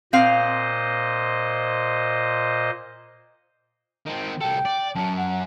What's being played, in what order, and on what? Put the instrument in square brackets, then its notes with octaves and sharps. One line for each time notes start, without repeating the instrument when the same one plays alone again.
[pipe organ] A#2 C5 D#5 [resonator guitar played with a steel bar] C4 F5
[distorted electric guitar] D#3 C4
[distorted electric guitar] C2 A4 [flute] G5
[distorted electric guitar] D5
[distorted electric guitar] F#2 F#3 [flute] A5
[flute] F#5